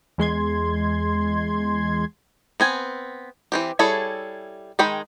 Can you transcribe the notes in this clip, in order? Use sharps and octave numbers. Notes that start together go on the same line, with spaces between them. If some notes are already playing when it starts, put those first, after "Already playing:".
E2 G#3 C6 G#6
B3 C4 G#5
E3 C4 G4
G3 E4 G#4 A4 C#5
D#3 G#3 D#4 G5 B5